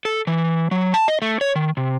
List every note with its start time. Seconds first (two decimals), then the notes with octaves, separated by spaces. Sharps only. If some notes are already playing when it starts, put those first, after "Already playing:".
0.05 A4
0.27 E3
0.71 F#3
0.94 A5
1.08 D#5
1.22 A3
1.41 C#5
1.56 D#3
1.77 C3